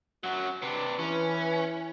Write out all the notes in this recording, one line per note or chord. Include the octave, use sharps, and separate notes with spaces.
F#2 F#3 F#4
C3 D4 B4
E3 C#4